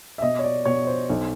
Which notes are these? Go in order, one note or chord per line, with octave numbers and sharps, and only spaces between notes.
E5
B2 D#5
C#5
D5
B2 C#5
C5
B1